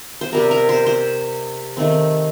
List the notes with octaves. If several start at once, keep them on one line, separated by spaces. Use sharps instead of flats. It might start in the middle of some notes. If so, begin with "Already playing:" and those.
C5
C3 G3 C4 A#4
A#4
C5
C5
D#3 A3 C4